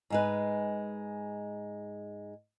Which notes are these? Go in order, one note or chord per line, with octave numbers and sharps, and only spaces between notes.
G#2 G#3 B4